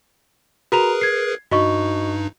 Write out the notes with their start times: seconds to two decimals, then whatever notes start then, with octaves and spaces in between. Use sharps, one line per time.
0.72 F#4 G#4 A#4 B4 A#5 F7
1.01 G#6 C7
1.52 G2 D#4 F#4 D#5 C#6